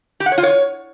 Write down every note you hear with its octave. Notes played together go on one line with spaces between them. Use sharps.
G4
F#5
C#5
F4
C#5